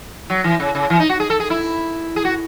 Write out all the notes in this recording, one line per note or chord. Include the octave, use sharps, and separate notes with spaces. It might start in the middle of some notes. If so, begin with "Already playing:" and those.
F#3
E3
C#3
C#3
E3
D#4
F#4
G#4
A4
G#4
E4
G#4
F#4